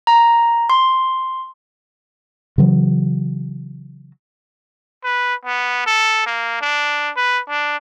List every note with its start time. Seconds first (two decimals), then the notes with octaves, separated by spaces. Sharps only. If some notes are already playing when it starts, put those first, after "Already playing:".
0.07 A#5
0.70 C6
2.58 C#3 E3 F#3
5.04 B4
5.45 B3
5.86 A4
6.26 A#3
6.61 D4
7.17 B4
7.49 D4